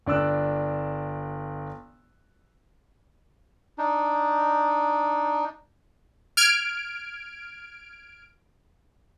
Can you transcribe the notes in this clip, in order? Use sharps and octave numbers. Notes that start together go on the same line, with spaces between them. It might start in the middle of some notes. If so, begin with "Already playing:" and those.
G1 D4 D5 E6 F#6
D4 D#4
F6 G#6 D7